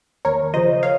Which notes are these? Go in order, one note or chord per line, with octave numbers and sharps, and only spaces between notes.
D#2 A#4 C#5
C#3 F3 C5 D#5
C#5 F5